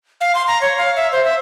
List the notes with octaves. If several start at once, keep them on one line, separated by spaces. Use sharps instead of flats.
F5
C6
A#5
C#5
F5
E5
C5
E5